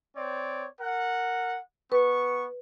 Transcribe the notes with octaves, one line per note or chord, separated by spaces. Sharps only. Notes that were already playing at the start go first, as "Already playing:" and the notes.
C4 C#5 D5
A#4 F#5
B3 B4 C#6